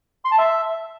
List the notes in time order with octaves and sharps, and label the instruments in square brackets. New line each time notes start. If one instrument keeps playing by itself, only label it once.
[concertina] C6
A5
E5